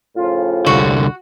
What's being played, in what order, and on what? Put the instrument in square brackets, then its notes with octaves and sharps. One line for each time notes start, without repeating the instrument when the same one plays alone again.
[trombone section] A2 C#3 F3 [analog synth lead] F4
[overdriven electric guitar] C2 D3 [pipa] F#4